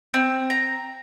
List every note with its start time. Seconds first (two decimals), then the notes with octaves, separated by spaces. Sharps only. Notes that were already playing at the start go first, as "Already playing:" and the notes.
0.14 C4
0.50 A#5